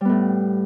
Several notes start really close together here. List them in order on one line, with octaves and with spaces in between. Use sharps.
G3 B3 A2